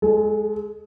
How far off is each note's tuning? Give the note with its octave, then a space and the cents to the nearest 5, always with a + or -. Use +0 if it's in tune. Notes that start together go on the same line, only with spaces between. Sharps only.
G#3 +0 A4 -35